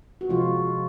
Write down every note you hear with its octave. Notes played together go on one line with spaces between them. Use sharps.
F#4
C3 F3 G#3 F4